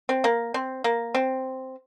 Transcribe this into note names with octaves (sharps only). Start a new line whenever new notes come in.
C4
A#3
C4
A#3
C4